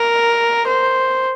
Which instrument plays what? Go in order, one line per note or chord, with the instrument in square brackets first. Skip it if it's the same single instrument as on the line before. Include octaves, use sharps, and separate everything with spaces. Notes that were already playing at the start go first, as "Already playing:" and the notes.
Already playing: [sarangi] A#4
C5